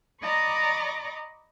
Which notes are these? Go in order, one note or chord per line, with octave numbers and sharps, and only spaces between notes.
D5 D#5 A#5 B5 C#6 D6